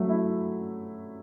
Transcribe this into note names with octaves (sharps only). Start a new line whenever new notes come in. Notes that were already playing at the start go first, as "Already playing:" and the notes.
Already playing: F#3 A3
E4